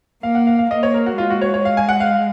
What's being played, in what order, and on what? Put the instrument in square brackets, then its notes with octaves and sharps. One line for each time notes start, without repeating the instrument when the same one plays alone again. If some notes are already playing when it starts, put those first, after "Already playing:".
[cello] A#3 [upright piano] F5
[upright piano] F#5
F5
F5
[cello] A#3 [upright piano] D#5
[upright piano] C#5
A#4
F#4
[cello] G#3 [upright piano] F4
[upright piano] F#4
C#5
C#5
F5
G#5
F#5
F5